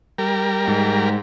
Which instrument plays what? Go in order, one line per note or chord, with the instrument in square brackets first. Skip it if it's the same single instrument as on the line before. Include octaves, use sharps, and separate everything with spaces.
[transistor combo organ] G3 A#4
[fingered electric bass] G#2